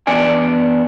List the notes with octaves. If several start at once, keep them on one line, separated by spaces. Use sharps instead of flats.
E2 B3 D4 D5 G#5